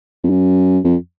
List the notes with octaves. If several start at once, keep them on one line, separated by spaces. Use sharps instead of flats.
F2
F#2
F2